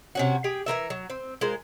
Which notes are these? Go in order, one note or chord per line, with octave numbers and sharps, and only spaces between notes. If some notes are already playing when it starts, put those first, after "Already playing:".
C3 C#4 F#4
G4 G#4 G5
E3 F#3 A#4 E5
F#3
C4
G#3 F4 A#4 C5